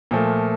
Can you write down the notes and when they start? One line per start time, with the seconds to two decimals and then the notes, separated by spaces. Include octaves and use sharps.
0.11 A#2 F3 A3